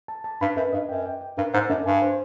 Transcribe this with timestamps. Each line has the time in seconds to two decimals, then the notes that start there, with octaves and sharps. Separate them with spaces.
0.08 A5
0.24 A5
0.41 G2 B5
0.57 F#2 B4
0.73 G2 D#5
0.89 F#2 G5
1.06 G5
1.21 G5
1.38 G2 A#4
1.53 G#2 D4
1.70 F#2 D4
1.86 G2 G#5
2.02 C5